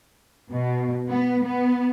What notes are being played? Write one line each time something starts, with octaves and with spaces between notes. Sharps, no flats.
B2
B3
B3